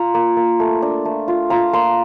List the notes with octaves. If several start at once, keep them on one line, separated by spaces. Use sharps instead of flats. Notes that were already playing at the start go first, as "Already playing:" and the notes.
Already playing: F4 A#5
A#3
A#3
A3
D4
A3
F4
F4 A#5
A#3 C6